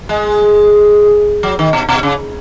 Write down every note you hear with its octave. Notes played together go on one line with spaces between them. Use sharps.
G#3
F#3
D#3
B2
B2
C#3